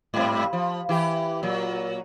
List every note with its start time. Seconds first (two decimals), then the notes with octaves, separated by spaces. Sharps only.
0.14 G#2 G3 C4
0.53 F3
0.89 E3 G4
1.43 A#2 F#3